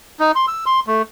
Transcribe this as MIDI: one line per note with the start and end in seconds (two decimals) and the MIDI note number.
0.20 0.32 63
0.36 0.46 84
0.48 0.65 88
0.66 0.80 84
0.87 1.02 57